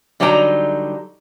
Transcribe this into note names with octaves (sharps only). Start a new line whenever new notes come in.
D3 F#3 G3 D#4 B4 A#5